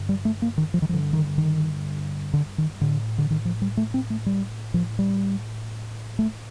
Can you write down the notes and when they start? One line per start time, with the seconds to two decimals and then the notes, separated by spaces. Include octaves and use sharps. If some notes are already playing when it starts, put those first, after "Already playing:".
Already playing: G2 D3
0.09 G3
0.25 A3
0.42 A#3
0.58 D#3
0.74 F3
0.82 D#3
0.89 G2 D3 F3
1.13 D#3
1.38 D#3
2.33 D3
2.58 D#3
2.81 A2 D3
3.18 D3
3.30 D#3
3.45 F3
3.62 G3
3.77 A3
3.94 C4
4.10 A3
4.26 G3
4.74 A2 F3
4.99 G3
6.19 A3